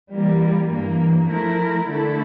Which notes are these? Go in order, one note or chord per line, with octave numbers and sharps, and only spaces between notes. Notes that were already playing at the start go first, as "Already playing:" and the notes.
E3 G3 A#3
G2 E3 A#3
F3 A3 E4 A#4
D3 A3 E4 A4